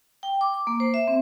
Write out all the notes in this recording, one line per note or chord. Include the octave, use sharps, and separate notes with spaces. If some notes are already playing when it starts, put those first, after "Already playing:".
G5
D6
D6
A#3
C5
E5
C4